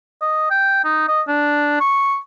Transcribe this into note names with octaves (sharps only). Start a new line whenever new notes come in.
D#5
G5
D#4
D#5
D4
C#6